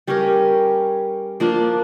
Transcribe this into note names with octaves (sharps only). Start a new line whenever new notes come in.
G3 C#4 G4 A#4
F3 A#3 D4 F4